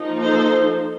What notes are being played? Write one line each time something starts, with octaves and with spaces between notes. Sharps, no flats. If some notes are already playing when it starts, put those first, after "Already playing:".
Already playing: F3 A#3 D#4
A4 C5